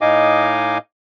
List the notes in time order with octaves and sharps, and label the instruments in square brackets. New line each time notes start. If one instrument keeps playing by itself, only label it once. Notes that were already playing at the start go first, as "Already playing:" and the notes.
[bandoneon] A2 D#4 D#5 F5 G#5 D6